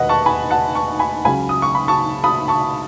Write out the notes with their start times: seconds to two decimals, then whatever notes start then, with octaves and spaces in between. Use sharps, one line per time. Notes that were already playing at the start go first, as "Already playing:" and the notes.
Already playing: E1 D#2 D#3 B4 D#5 F#5
0.09 A5 C#6
0.26 G#5 B5
0.50 F#5 A5
0.75 A5 C#6
0.99 G#5 B5
1.25 C#2 C#3 F#3 G#5 B5
1.49 D#6
1.62 C#6
1.75 B5
1.88 A5 C#6
2.24 B5 D#6
2.48 A5 C#6